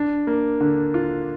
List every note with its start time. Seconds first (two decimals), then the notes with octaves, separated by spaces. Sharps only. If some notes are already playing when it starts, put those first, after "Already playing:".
Already playing: D4
0.27 A#3
0.61 D3
0.94 F4